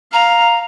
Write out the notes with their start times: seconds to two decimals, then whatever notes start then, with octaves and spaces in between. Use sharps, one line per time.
0.13 F5 A#5